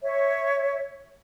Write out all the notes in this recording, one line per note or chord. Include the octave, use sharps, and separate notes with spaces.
C#5 E5